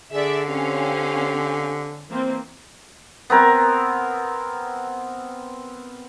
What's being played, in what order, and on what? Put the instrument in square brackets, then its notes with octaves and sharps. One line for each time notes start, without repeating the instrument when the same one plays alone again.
[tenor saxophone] D3 [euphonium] G#4 [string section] D5 E5
[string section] C4 C#4 F5 [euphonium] G4
[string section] E3 A#3 C4
[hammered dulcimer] B3 C4 A#4 G#5